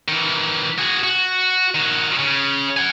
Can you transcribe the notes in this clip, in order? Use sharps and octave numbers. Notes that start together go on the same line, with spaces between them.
D#3 E3
F#4 G#4
F#4
D#3 F#4
C#3
F#5 G#5